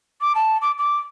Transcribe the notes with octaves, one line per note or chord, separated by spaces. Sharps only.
D6
A5
D6
D6